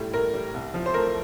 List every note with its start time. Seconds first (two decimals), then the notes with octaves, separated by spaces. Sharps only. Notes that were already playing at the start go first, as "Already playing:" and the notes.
Already playing: A2 G3
0.14 A2 A#4
0.34 G3
0.54 C2
0.74 F3
0.86 C5
0.94 A3 A#4